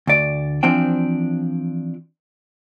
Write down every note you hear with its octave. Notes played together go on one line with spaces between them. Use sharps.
D2 D5
E3 F3 C4 D4 G5